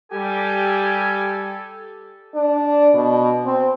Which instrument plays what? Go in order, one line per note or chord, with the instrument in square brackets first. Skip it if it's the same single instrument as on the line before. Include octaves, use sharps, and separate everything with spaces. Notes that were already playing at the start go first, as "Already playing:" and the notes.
[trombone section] G3 G4 [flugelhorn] A4 [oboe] G#5
[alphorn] D4
B2
C4